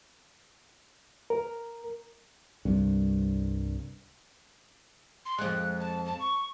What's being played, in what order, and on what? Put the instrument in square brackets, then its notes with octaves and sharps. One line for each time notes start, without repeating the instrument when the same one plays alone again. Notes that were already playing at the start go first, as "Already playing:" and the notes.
[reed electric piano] A#4
[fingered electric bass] C2 G2 C3
[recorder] C6
[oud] F2 G#3 [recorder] F#6
[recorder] A5
A5
C#6